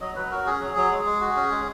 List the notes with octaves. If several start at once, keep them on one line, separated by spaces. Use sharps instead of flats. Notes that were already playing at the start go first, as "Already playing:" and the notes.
F#3 D#5
F#3 B4
F#4 A#4
C#4 G#4
F#3
F#3
G#3
G#3
F#4
C#4
G#3